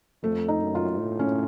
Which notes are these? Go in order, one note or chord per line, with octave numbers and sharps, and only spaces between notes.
F2 A3
D#4
F#2
F4
A2
C#4